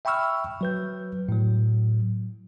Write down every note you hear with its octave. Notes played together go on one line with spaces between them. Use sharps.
E5 G5 B5 C#6 E6 F6
F#3 B4 G6
A2 F#3